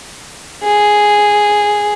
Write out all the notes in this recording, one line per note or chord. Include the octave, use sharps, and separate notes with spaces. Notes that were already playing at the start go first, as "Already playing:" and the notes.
G#4